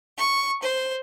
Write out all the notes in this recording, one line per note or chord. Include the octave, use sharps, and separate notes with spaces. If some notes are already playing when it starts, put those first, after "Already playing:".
C#6
C5